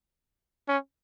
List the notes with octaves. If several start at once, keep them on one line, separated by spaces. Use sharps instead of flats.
C#4